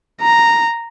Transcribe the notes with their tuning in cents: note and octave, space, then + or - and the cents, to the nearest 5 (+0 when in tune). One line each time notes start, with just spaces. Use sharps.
A#5 -5